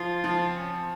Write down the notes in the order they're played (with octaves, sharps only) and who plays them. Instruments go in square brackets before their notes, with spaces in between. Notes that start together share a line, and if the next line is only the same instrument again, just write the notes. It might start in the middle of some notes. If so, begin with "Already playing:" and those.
Already playing: [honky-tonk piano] F3 [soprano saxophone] F4
[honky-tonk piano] F3
[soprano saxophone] C4
C#4
C4